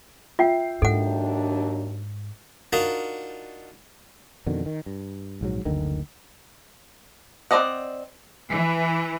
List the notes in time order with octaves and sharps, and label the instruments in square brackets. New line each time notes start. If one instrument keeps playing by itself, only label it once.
[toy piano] F4 [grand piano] E5 G5 C7
[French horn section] D#2 F#3 D4 [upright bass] G#2 [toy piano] A4 F#5
[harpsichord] D4 D#4 F4 F#4 A#4 D#5
[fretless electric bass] F2 B2 D3 D#3
D#3
G2
A#1 G#2 F#3
F#1 D2 D3 D#3
[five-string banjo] C4 C5 D5 D#5 F#5
[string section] E3